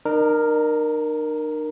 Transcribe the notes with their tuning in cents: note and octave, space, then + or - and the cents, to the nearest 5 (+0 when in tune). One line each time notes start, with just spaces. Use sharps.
D#4 -45 A#4 +0